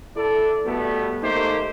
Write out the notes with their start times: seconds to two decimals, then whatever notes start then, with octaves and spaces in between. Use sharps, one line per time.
0.17 E4 A4 D5
0.65 B2 G3 A3 B3
1.23 D#3 A3 A#3 D#4 G4 C5